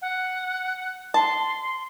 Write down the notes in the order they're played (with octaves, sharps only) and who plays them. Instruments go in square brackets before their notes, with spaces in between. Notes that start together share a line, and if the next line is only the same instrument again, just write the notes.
[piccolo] F#5
[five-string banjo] A5 [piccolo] C6